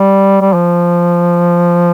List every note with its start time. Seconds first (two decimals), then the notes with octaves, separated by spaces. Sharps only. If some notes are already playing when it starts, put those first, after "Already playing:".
Already playing: G3
0.41 G3
0.53 F3